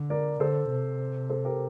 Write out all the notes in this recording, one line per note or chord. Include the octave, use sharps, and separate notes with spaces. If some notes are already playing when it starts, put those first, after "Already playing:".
Already playing: D3
A#4 D5
D3 A4 C5
C3
A4 C5
G4 A#4